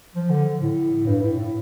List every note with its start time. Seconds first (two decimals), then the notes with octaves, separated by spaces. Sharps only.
0.16 F3
0.30 D3
0.60 A2
1.07 G2
1.22 A2
1.38 A2